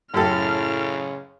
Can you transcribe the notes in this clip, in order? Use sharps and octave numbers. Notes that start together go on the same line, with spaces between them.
F#2 A2 C#3 G4 A4 F6